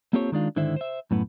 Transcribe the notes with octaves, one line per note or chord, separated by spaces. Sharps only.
A#3 C4 F4 G4 A4 C#5
D#3 G#3 D4 F4
G#2 D3 D#3 E4 C5 E5
C5 E5
F#2 A2 B3